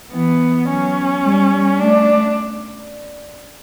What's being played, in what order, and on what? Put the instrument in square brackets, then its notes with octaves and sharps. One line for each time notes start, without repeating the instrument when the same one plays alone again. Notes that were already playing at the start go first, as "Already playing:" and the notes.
[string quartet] E3 [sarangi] B3
[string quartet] F#3 [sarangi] C#4
[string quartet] G3
[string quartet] A3 [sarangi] D4